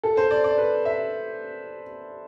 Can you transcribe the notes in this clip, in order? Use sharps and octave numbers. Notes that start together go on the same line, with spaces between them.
A4
C5
D5
D5
B4
E5